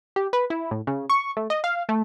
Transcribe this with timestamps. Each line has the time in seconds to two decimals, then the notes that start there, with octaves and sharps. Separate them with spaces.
0.16 G4
0.33 B4
0.50 E4
0.71 A2
0.87 C#3
1.10 C#6
1.37 A3
1.50 D#5
1.64 F5
1.89 A3